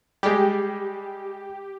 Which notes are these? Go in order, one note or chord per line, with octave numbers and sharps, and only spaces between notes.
G3 G#3 G4